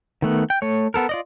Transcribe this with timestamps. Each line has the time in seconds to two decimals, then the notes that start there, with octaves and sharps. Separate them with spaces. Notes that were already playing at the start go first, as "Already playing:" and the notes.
0.22 D#3 A3 B3
0.50 G5
0.62 A3 C#5
0.94 B3 A4 A#4
1.09 F4 D5 D#5